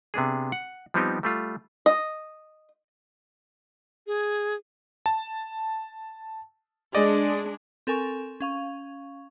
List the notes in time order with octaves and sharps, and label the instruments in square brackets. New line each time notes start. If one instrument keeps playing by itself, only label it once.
[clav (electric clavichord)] C3 B3 D4 G#4
F#5
F3 G3 B3 C4 D#4 G4
G3 A3 F4
[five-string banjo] D#5
[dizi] G#4
[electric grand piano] A5
[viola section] G#3 D4 G#4 [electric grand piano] D5 D#5
[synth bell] C4 A4 A#4 G#5 C6 C#6
C#4 F5 C#6